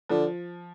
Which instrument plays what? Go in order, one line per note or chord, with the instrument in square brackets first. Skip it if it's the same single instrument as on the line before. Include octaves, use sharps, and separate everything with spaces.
[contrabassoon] D3 [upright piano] F3